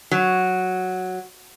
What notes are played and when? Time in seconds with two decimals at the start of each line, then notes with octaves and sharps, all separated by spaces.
0.11 F#3